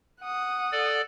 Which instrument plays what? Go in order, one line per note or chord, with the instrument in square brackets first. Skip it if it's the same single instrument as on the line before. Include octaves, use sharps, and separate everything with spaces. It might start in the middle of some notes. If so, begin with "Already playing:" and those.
[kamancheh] F#5 D#6
[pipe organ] A4 D5